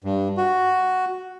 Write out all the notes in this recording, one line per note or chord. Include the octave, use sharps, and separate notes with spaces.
G2
F#4